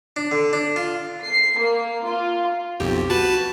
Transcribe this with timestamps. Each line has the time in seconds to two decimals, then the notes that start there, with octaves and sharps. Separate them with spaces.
0.16 D4
0.31 D3
0.53 D4
0.76 F4
1.24 C7
1.60 A#3
2.05 F4
2.80 B1 F2 G4
3.10 F#4 B4 A5